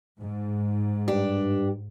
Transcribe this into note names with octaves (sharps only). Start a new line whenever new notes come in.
G#2
G2 D4 G4